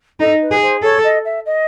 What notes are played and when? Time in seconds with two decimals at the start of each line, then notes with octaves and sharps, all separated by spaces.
0.20 D#4 A4
0.41 B4
0.51 G#4
0.62 C5
0.83 A4 C#5
1.03 D#5
1.25 E5
1.45 D#5